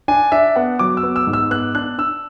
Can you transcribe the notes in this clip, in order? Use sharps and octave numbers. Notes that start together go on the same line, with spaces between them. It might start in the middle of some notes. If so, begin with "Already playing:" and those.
D4 G#5
D4 E5
B3 F#5
F#3 D6
E6
B3
E6
G#2
E6
B3 F#6
D4 F#6
D4 E6